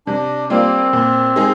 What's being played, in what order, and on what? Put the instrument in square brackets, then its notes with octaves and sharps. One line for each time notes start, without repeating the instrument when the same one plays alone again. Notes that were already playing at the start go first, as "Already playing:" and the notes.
[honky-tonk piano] C3 [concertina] D4
[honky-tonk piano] G3 A#3 D4 F4 [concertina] C4
[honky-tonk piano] A#2
G#3 D#4 G#4